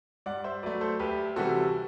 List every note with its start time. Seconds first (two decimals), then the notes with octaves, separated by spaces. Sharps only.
0.26 G2 D5 F#5
0.44 C5 E5
0.63 F#3 A3 B4 D5
0.81 A4 C5
0.99 D2 G4 B4
1.36 C3 E3 G3 F#4 A4